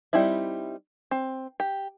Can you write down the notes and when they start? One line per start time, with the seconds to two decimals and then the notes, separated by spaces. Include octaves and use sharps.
0.13 G3 C4 D#4 E4 E5
1.11 C4
1.60 G4